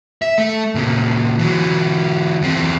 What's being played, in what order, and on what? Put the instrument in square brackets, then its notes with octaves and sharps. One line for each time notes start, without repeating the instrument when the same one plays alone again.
[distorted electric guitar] E5
A3
A#2 C#3
E3 F#3
E2 C4